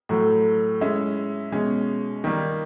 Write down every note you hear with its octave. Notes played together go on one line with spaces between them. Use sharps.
A2 F#3 A3
G#3 C#4 E4
B2 G#3 C#4
D#3 G3 A#3